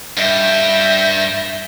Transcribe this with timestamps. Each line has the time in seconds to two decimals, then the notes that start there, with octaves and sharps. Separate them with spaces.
0.17 G2 E5 G6 A#6